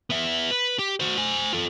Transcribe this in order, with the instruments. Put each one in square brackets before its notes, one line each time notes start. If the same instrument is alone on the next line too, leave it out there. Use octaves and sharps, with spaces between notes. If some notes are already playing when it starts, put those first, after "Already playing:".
[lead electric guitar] B3 E5
B4
G4
F#4 C5
C5 G#5
F4 A4